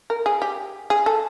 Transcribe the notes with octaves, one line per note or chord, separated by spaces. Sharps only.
A#4
G#4
G4
G#4
A4